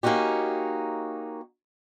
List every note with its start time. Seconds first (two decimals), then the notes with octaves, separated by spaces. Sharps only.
0.03 A#3 C#4 D#4 F#4 G4